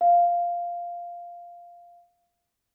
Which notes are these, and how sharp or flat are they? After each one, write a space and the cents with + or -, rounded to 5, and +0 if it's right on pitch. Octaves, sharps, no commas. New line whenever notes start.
F5 -5